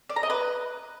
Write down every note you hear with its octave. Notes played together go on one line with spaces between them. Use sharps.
D5
A#5
D#5
B4